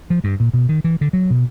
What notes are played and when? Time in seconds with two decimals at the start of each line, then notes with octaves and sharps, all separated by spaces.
0.10 F3
0.24 G2
0.40 A#2
0.54 B2
0.69 D#3
0.84 E3
1.01 D3
1.13 F#3
1.30 B2